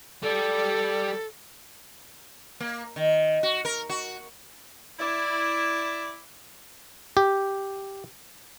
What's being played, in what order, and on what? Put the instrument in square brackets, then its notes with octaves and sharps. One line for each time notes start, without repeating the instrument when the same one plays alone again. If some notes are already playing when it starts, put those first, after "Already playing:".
[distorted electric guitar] G3 D5 [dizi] A4
[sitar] A#3
D#3
F#4
A#4
F#4
[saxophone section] E4 D5
[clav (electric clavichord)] G4